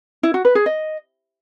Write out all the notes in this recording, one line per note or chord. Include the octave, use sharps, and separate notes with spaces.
E4
F#4
B4
G#4
D#5